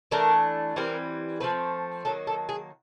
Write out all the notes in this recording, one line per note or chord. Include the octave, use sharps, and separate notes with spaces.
E3 A3 D4 A#4
E3 G3 C4 A#4
F3 A3 C4 B4
D#3 F#3 A#3 A4
A4
G#4